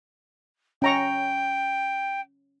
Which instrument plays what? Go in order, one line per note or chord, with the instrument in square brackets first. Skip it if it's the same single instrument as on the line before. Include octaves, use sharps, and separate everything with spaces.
[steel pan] C#4 A#5 C#6 [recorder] G5